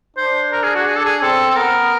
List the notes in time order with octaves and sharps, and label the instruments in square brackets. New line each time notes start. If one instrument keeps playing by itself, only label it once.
[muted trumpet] D4 [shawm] C5
[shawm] A#4
G#4
F#4
G#4
A4
G#4
[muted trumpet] C4 [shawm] A4
[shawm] A4
[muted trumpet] B3 [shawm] A#4